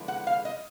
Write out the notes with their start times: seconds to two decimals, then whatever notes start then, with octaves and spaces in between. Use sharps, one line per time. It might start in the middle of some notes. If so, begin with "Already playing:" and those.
Already playing: D3 F3 G#3 B3 E4
0.08 F#5
0.27 F5
0.45 D#5